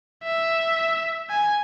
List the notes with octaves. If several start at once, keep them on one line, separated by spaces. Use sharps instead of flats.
E5
G#5